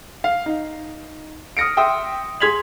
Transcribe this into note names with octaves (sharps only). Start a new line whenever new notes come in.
F5
D#4
D#6 F6 A#6 C#7 D7
E5 G5 C6 D#6 E6
G#4 C6 G#6 B6 F7 F#7